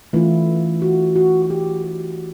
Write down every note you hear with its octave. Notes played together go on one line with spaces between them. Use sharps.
E3 A3 C#4 E4 F4
F#4
F#4
F#4
G4
G4